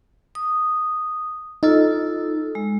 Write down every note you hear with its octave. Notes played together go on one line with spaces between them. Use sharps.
D#6
D#4 F4 A4 E6
G#3